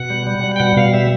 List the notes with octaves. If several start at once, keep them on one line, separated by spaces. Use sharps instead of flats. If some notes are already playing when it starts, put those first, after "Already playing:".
Already playing: B2 F#5
G3
G3
G3
G5
B2 F#5
B2 F5
G3 E5